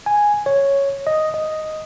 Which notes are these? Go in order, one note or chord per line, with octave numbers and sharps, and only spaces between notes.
G#5
C#5
D#5
D#5